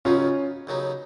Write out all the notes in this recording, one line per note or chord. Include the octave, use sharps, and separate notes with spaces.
D#2 C#3 F#3 B3 C#4 D#4 F4
D#2 C#3 F#3 B3 D#4